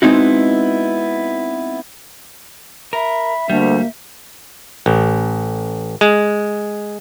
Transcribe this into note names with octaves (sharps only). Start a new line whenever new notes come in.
G#3 B3 C4 D#4 E4 F#4
A#4 E5 B5
D2 G3 A#3
A1
G#3